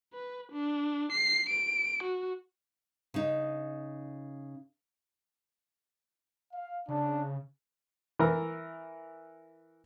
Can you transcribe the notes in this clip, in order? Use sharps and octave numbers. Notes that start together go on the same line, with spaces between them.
B4
D4
C7
D7
F#4
C#3 D#4
F5
C#3 D4
E3 A#4